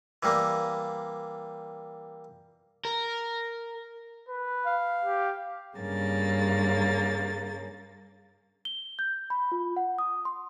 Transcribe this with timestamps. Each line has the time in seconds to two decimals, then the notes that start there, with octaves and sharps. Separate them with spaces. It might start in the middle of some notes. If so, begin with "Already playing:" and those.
0.23 E3 G3 A#3
2.85 A#4
4.29 B4
4.66 F5
5.04 G4
5.77 G2 C#3 A#3 A6
8.65 G7
8.99 G6
9.30 B5
9.52 F4
9.77 F#5
9.99 D#6
10.25 C6